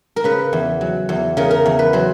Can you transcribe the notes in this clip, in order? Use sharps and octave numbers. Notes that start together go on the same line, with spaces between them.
A#4
C#3 B4
E2
F#3
E2
C#3 A#4
A#4
E2
B4
F#3 C5